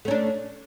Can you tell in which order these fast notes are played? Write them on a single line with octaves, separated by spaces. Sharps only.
A3 C#4 D4